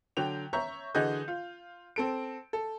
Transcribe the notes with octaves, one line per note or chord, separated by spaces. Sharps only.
D3 F#3 G5 F7
C#5 E5 A#5 C#6 G6
D3 E3 F#4 G#4 D#5 G6
F4
C4 A4 D7
A4